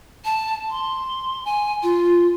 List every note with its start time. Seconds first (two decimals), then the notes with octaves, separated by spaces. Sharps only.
0.25 A5
0.70 C6
1.45 G#5
1.83 F4